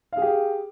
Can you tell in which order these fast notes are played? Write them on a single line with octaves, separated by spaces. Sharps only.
F5 G#4 G4